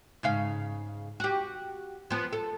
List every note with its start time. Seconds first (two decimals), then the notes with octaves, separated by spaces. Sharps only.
0.23 G#2 C#3 F5
1.20 F#4 G4
2.10 F3 B3
2.33 A4